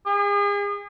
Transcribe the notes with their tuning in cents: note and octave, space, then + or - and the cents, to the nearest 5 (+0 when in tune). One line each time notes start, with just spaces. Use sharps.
G#4 -40